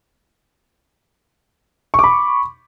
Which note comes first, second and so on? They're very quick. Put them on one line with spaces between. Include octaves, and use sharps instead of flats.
C#6 D6 B5